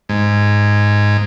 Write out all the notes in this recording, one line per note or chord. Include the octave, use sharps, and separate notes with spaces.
G#2